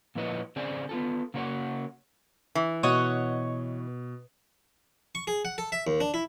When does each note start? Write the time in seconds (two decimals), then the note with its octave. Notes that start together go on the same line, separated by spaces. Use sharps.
0.15 A#2 F3 E4 B4 C#5 D#5
0.56 C#3 C4 G#4 D5 G#5
0.89 B3 F4 A4
1.34 C#3 A#3 F#4 A#4 C#5 F#5
2.55 E3
2.83 B2 C#5 D#5 F#5
5.15 C#6
5.27 G#4
5.45 F#5
5.58 A4
5.72 E5
5.87 D#2
6.01 D4
6.14 E4